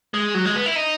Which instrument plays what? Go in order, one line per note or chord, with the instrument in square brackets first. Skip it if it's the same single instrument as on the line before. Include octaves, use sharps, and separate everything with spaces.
[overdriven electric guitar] G#3
F#3
G#3
B3
E4
D#4